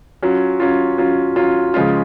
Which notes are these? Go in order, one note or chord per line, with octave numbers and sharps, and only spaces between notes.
F#3 C#4 F4
F#3 C#4 F4
F#3 C#4 F4
F#3 C#4 F4
C#3 F3 G#3 C#4 F4